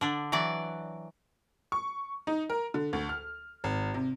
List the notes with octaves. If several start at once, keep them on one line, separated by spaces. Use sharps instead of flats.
D3 D4
E3 F#3 D5
C#6
D#4
A#4
D3
D2
F6
G#1
C3